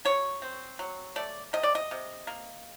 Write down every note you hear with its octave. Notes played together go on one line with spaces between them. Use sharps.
F#3 C#5
C4
F#3
A3 D5
C3 D#5
D5
D#5
C3
A#3